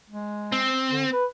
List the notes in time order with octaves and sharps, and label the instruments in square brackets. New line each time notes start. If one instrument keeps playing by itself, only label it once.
[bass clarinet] G#3
[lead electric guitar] C4
[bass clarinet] D3
B4